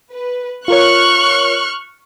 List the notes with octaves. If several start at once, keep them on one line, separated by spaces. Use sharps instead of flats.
B4
F4 A#4 C#5 C#6 F6 F#6